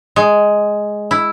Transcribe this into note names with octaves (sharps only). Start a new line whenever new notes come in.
G#3
E4